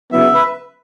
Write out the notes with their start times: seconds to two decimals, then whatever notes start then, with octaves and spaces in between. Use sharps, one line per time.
0.12 C#3 F#3 B3 E4 E5
0.34 B4